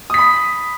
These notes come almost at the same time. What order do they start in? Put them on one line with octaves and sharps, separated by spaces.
D#6 B6 B5